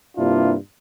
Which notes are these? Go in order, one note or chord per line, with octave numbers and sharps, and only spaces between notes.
G2 C3 A#3 D4 E4 F4